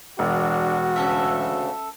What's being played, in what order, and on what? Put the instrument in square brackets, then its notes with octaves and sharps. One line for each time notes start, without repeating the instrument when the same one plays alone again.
[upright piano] E1 [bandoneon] D4 [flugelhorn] F#4
[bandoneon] D2 C#3 [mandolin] C#4 A4 E5